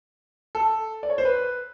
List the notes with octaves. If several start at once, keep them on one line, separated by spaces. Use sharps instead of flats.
A4
D5
C#5
C5
B4